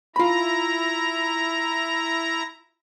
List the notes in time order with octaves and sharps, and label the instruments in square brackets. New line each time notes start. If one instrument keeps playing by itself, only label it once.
[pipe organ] E4 A#5 [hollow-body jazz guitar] F4 B5